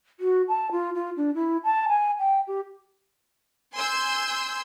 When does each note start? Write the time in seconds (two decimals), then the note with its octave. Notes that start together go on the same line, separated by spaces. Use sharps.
0.20 F#4
0.48 A5
0.71 F4
0.94 F4
1.16 D4
1.34 E4
1.64 A5
1.88 G#5
2.19 G5
2.47 G4
3.75 G#5 C6 E6 G6